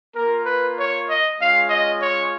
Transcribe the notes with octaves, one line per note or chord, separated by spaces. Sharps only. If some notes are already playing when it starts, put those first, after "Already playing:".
A#3 F4 A#4
B4
C#5
D#5
G#3 C#4 F4 F5
D#5
C#5